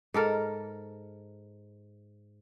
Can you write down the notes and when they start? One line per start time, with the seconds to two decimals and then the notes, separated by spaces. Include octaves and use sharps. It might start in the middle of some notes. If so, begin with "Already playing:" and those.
0.14 G#2 A4 A#4